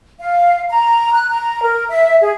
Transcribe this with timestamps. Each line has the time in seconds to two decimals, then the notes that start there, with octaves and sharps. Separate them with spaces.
0.19 F5
0.68 A#5
1.14 F#6
1.29 A#5
1.63 A#4
1.89 E5
2.21 G#4